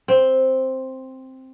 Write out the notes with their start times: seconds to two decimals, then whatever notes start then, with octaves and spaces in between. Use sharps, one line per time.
0.08 C4